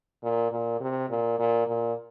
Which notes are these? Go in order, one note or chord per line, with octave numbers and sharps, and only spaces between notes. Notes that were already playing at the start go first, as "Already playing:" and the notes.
A#2
A#2
C3
A#2
A#2
A#2